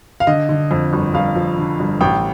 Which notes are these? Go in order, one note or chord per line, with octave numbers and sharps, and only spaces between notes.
F5
D3 D#5
D3
F2
G1
G1 F5
F3
D3
G1
A1 G5